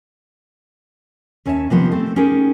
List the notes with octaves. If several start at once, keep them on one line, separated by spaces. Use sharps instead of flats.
D#2 C#4 C#5 E5 F5 A5
C3 D#3 F3 A#3 B3 D#4
A3 C4 A4
C#4 D#4 G4 G#4 A#4